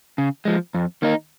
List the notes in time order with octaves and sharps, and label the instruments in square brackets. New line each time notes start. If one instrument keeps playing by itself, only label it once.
[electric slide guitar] C#3
F3 G#3
F2
D#3 A#3 D#4